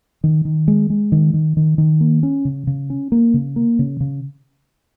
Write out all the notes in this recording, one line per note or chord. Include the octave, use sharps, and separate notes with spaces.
D#3
D#3
G#3
G#3
D#3
D#3
D#3
D#3
A#3
C#4
C#3
C#3
C#4
A#3
C#3
A#3
C#3
C#3